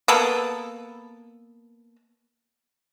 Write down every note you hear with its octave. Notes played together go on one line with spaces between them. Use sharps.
A#3 B3 A4